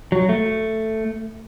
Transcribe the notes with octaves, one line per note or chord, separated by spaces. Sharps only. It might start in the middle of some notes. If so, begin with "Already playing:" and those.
F#3
A3